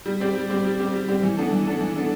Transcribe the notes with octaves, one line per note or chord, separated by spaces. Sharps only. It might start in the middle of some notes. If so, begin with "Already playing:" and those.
G3
C4 G4 D5
G3
C4 G4 D5
G3
C4 G4 D5
G3
C4 G4 D5
E3
B3 D4 A4
E3
B3 D4 A4
E3
B3 D4 A4